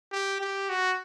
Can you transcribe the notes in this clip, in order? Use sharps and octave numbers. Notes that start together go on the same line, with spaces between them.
G4
G4
F#4